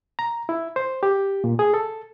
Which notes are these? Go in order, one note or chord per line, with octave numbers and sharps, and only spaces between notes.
A#5
E4
C5
G4
A#2
G#4
A4